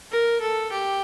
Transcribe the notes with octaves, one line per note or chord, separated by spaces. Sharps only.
A#4
A4
G4